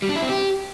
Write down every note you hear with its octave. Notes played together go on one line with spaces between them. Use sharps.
G3
D4
E4
C4
G4